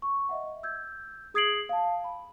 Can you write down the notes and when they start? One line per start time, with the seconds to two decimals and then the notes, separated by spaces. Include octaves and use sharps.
0.02 C#6
0.29 D#5 E5 F#5
0.63 E6 G6 G#6
1.34 G#4 D#6 G#6 C7 D7 F#7
1.69 F5 A5
2.04 B5